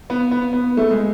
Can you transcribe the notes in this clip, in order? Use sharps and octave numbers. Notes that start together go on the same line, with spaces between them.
B3
B3
B3
A3
G#3